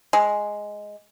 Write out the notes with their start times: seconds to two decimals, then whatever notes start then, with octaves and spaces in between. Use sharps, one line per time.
0.13 G#3